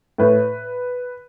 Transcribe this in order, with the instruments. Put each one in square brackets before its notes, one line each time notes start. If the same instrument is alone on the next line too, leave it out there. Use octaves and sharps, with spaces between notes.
[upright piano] A2 B4